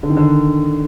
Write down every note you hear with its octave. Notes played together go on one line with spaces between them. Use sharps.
D3
D#3
D3